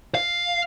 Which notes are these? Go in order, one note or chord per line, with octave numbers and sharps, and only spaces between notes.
F5